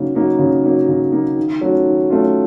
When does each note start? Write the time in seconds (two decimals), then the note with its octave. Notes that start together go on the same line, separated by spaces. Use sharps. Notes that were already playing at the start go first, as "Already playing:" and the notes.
Already playing: C#3 F#3 A#3 D#4
0.15 F#3 A#3 D#4
0.39 C#3
0.63 F#3 A#3 D#4
0.88 C#3
1.12 F#3 A#3 D#4
1.36 D#3
1.61 F#3 A3 C#4 F4
1.86 D#3
2.10 F#3 A3 C#4 F4